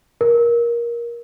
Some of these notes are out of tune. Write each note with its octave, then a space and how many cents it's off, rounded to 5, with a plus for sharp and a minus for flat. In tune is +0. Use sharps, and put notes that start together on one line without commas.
A#4 +15